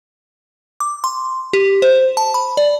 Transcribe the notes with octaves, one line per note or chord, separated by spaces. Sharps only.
D6
C6
G4
C5
A5
B5
D5